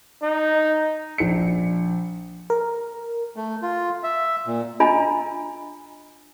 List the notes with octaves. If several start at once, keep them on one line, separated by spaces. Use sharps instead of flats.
D#4
A#1 C#7
A#4
A3
F4
E5
A#2
D4 F4 D#5 G#5 A#5 B5